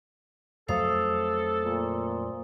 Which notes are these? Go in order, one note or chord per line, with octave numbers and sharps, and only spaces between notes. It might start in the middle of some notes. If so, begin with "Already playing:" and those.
F2 F#3 A3 A4 C5 F5 D#6
A#2